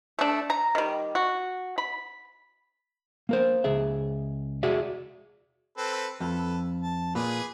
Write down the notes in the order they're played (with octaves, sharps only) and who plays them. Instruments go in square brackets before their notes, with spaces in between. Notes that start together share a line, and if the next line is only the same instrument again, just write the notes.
[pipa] A3 D4
A#5
D#3 G3
F#4
B5
[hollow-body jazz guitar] A#3 A#4 C5
C#2 G#4 E5
F#4 G#4 D5 E5
[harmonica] C4 A4 B4
[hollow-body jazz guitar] F2 [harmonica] A4 B4
[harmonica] A5
[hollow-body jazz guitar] A#2 [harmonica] G#4 B4